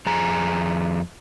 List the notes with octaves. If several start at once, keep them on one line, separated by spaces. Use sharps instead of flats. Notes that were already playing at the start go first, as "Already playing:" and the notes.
F2 G#4 A#5